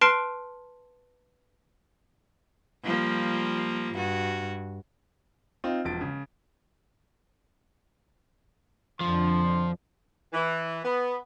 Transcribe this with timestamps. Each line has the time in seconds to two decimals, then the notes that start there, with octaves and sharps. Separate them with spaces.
0.01 B4 A5 C6 F6 C7 D7
2.84 F3 G3 A#3
3.95 G2 F#4
5.64 C4 D#4 F4
5.85 E1 F3 A6 D7
6.01 C#3
9.01 F2 D3 F3 C6
10.33 E3
10.84 B3